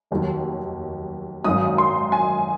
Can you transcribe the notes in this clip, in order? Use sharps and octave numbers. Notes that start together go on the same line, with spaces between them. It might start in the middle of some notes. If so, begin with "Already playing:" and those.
F1 D#2 D#3 F#3
G#1 F#2 D#3 F#3 D#6
C6
G#5